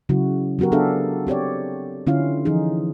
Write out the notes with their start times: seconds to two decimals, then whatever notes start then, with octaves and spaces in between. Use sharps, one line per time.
0.09 C#3 F#3 E4 F#4
0.59 F#3 B3 F#4 G4 A#4
0.72 B3 D4 G#4 A4 E5 F5
1.27 C4 G4 C#5 D5
2.07 D3 C#4 E4 F4 F5
2.45 E3 F3 D#4 G#4